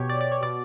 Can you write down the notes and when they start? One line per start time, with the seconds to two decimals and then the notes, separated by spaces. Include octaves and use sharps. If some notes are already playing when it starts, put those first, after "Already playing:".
Already playing: B2 G4 C#5
0.09 D5
0.21 D5
0.32 C#5
0.43 B2 D5